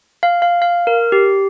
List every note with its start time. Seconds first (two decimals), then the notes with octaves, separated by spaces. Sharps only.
0.23 F5
0.42 F5
0.62 F5
0.87 A#4
1.12 G4